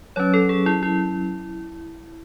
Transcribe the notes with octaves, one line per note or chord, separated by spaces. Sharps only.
F#3 C#4 C#5
A4
G#4
E4
E4